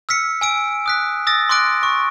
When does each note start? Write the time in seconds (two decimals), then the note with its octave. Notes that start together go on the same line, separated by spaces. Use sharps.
0.09 E6 F6 B6 C#7
0.41 G#5 E6 D7
0.86 D#6 F#6 B6
1.27 D#6 E6 A6 A#6
1.49 C6 D6 D#6 F#6 A#6 D7
1.83 C#6